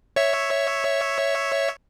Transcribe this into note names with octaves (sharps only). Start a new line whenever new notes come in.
C#5 E5